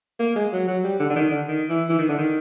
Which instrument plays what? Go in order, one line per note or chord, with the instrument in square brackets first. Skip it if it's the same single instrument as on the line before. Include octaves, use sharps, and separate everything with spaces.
[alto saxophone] A#3
G#3
F#3
F#3
G3
D3
D3
D#3
D3
D#3
E3
E3
D#3
D3
D#3